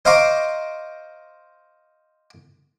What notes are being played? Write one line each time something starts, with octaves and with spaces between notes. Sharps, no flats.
C5 D#5 F5 A#5 C#6 D6